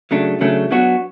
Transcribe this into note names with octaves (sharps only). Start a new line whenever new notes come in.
C#3 F#3 A3 D4
C#3 F#3 A3 D4
F#3 B3 D4 F#4